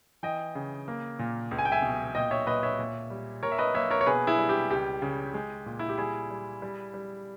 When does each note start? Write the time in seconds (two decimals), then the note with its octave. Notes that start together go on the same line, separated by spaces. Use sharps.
0.23 E3 D#5 G5
0.55 C#3
0.88 A#3
1.19 A#2
1.51 C#2
1.58 G#5
1.65 G5
1.72 E5 G#5
1.82 B2
2.15 A#2 D#5 G5
2.31 C#5 E5
2.47 A#2 B4 D#5
2.63 C#5 E5
2.79 A#2
3.10 G3
3.43 A#2 A#4 C#5
3.52 E5
3.58 B4 D#5
3.74 A#3 C#5 E5
3.90 A#4 C#5
4.01 C#5
4.06 B2 G#4 B4
4.27 E4 G#4
4.38 G3
4.49 G4
4.71 C#2 G4
5.02 C#3
5.34 G#3
5.66 A#2
5.79 E4
5.89 G4
5.98 G3 E4 G#4
6.31 G3
6.62 G3
6.94 G3